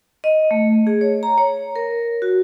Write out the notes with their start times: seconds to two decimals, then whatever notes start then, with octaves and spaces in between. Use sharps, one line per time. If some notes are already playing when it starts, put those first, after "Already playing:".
0.24 D#5
0.51 A3
0.87 G#4
1.01 C#5
1.23 A#5
1.38 C#5
1.76 A#4
2.22 F#4